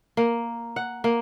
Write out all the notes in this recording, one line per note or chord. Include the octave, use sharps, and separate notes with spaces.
A#3
F#5
A#3